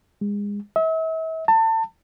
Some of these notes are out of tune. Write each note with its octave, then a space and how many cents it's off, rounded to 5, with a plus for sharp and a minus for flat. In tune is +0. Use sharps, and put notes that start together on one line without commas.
G#3 -30
E5 -40
A5 +30